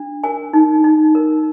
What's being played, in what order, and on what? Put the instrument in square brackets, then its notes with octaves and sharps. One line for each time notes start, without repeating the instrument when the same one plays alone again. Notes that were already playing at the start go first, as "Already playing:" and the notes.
Already playing: [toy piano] D4
A#4 G#5
D#4
D#4
A#4